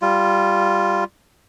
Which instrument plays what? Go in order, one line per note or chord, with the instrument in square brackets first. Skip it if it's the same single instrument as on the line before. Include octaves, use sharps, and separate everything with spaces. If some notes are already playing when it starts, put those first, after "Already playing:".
[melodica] G3 F4